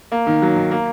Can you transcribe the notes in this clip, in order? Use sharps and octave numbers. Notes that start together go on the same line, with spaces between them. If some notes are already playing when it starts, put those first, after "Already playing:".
A#3
D#3
F#3
D#3
A#3